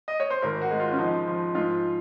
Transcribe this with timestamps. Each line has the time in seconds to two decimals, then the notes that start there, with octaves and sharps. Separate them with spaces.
0.08 D#5
0.20 C#5
0.30 C5
0.42 G#1 A#4
0.62 F#4
0.71 G#3
0.80 F4
0.91 C#4
0.98 F3 D#4
1.27 F3
1.55 G#2 F4